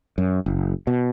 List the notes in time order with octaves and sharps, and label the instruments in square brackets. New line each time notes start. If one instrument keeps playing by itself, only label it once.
[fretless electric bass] F#2
F#1
B2